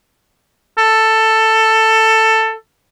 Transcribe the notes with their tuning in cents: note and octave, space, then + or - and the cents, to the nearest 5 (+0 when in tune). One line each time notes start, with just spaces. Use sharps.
A4 +10